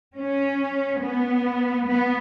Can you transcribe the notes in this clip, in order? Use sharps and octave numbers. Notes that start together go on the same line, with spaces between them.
C#4
B3
B3